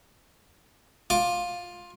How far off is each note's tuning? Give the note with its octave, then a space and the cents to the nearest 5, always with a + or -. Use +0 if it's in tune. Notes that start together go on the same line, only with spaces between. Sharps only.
F4 +15 D6 +5